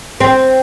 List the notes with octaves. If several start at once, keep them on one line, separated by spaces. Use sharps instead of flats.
C4